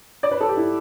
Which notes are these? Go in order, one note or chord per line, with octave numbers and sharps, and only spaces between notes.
D5
B4
A4
G4
E4